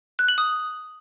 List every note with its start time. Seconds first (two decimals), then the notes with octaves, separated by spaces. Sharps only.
0.19 F#6
0.28 F#7
0.38 D#6